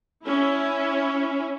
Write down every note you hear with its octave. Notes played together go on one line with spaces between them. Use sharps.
C#4 E4